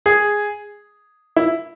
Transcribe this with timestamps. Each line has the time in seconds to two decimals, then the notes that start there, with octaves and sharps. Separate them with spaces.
0.06 G#4
1.36 E4